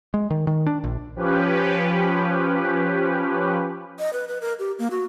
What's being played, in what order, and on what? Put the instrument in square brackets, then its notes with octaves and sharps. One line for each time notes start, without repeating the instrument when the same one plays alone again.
[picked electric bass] G#3
D#3
D#3
D4
A#1
[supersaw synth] F3 C#4 G4 B4
[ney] D#5
B4
B4
A#4
G4
A#3
F#4